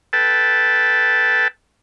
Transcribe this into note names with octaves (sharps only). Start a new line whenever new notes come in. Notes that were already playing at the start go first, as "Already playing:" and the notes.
A4 B4 G5 A5